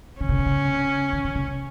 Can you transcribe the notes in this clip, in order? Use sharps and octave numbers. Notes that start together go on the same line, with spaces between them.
D3 C#4
C#3
C3
C#3
D3
D3
C#3
C3